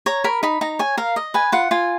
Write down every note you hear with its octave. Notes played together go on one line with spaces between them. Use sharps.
C#5 A#5
A#4 B5
D#4 B5
D#4 A#5
C#5 G#5
A#4 F5
D#5
B4 G#5
F4 F#5
F4 G#5